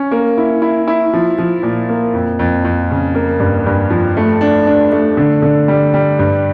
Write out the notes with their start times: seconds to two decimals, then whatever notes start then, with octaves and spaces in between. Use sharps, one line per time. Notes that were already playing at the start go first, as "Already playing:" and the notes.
Already playing: C#4
0.12 A#3
0.38 E4
0.62 E4
0.88 E4
1.13 F3
1.38 F3
1.63 A#2
1.89 A#3
2.14 F2
2.39 F2
2.65 F2
2.90 C#3
3.15 A#3
3.40 G2
3.66 G2
3.90 F3
4.17 A3
4.41 D4
4.66 D4
4.92 A3
5.17 D3
5.42 D3
5.68 G3
5.94 G3
6.19 G2